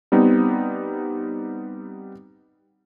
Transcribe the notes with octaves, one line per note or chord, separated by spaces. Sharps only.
G3 B3 C4 D#4